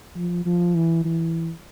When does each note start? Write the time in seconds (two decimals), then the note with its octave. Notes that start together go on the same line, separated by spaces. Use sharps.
0.16 F3
0.46 F3
0.75 E3
1.05 E3